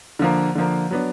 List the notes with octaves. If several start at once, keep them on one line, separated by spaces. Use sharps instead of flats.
D3 F3 A#3
D3 F3 A#3
F#3 B3 D4